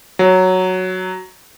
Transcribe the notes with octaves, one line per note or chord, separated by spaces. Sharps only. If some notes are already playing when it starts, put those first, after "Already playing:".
F#3